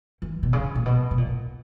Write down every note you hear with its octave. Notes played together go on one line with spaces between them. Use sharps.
E3
B2
C#3
A#2
B2
B2
A#2